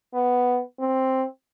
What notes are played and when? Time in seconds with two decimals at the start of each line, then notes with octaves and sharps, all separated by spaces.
0.14 B3
0.79 C4